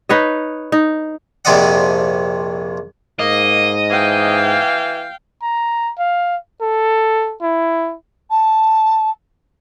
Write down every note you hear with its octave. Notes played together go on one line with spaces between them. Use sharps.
D#4 B4 C#5 D#5
D#4
A#1 F2 C3 D5 D#5 F#5
G#2 A#3 D#5
E3 F5 G5
A#5
F5
A4
E4
A5